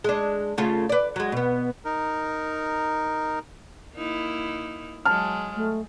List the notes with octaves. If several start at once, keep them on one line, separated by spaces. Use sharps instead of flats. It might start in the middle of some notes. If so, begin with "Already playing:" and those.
G#3 D4
C#3 A3 F4
B4 D5
F#3 G#3
B2 B3
D#4 A#4
A#3 D#4 E4
F#3 G#3 A5 F6
A3